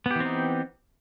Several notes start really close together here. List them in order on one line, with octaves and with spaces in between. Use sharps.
B3 G4 E3 C4 D#4